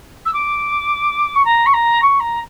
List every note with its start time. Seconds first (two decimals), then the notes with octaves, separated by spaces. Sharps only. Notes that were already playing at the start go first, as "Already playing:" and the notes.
0.25 E6
0.33 D6
1.35 C#6
1.45 A#5
1.66 C#6
1.73 A#5
2.01 C#6
2.19 A#5